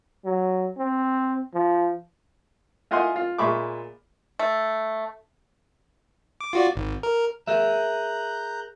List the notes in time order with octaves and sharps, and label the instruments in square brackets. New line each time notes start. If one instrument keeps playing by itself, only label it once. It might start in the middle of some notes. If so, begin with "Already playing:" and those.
[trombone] F#3
C4
F3
[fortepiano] E4 F4 D#5 F#5 G#5 C6
F4
A#2 G#3 E5 B5 C#6 D6
[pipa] A3
[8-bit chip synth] D6
F4 F#4 D5
G#1
A#4
[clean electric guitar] G#4 A#4 E5 [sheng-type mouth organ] A#5 F#6 G6